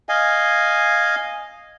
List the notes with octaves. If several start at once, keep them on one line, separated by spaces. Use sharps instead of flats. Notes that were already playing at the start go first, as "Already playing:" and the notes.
D#5 F5 G#5